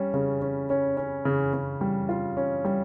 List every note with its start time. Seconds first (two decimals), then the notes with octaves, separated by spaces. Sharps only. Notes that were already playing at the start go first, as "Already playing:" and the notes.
Already playing: G3 C#4
0.14 C#3
0.42 C#4
0.70 C#4
0.97 C#4
1.25 C#3
1.53 C#3
1.81 G3
2.09 F4
2.37 C#4
2.65 G3